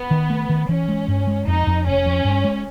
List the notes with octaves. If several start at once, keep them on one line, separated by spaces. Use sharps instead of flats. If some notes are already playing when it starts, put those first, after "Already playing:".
Already playing: B3
D#3
A3
D#3
E3 C#4
G#3
G2
G#3
F2 D#4
F2
F1 C#4
F2
G2
G#3